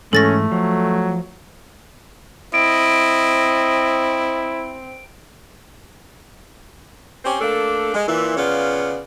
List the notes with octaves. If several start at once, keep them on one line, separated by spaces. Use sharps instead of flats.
G#2 E3 G#3 A3 C#4 A4 A6 A#6
F3 F#3
C4 E4 D#5 D7
C4 C#4 G4 C5
A3 A#3 D4 A4
G#3
A#2 E3
C#3 B3 F4 C#5 D5